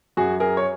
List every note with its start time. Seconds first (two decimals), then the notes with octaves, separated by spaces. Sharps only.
0.17 F#2 F#4 G#4
0.40 G#4 A#4
0.57 C#5